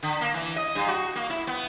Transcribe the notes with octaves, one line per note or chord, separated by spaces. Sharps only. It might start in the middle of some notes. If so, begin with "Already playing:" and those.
D3
A#3
E3
D#5
G2
F#4
A#3
E4
B3